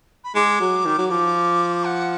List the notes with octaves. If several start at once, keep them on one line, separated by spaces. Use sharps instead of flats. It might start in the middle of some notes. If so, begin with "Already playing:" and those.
B5
G#3 D6
F#3
D#3
F#3
F3 D6
F#5